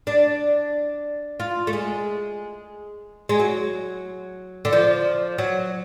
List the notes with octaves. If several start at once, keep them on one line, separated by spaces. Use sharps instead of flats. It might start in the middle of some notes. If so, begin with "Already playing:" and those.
D4
F4
A3
G#3
G#3
F#3
D3
F3
F#3